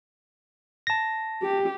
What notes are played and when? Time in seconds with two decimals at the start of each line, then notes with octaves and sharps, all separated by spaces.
0.87 A5 A#6
1.42 G4